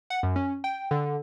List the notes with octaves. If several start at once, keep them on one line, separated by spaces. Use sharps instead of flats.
F#5
F#2
C#4
G5
D3